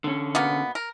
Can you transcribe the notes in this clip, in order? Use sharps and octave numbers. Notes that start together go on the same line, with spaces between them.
D3 C#4
B2 A#3 B3
A#4